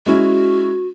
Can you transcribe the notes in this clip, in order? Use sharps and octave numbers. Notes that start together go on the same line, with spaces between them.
G#3 C#4 E4 F#4